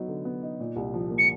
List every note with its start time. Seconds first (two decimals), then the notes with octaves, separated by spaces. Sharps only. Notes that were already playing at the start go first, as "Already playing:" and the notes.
Already playing: F#3 B3 D#4
0.08 D3
0.25 B3
0.43 D#4
0.60 A#2
0.76 C2
0.94 F3
1.10 A#3
1.18 C#7